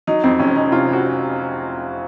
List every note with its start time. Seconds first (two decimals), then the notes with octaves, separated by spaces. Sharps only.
0.07 F#3 D#4
0.24 F2 C4
0.40 F1 C#4
0.56 F2 D#4
0.72 C3 F4
0.88 F2
0.93 F#4